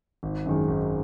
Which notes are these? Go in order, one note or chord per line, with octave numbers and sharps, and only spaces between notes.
G#1
F#2 D#3 G#3
G#1